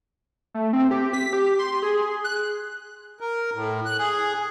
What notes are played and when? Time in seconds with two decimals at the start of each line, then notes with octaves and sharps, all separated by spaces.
0.54 A3
0.73 C4
0.91 G4
1.13 B6
1.33 G4
1.59 C6
1.82 G#4
2.24 F#6
3.20 A#4
3.54 A2
3.85 F#6
3.99 G#4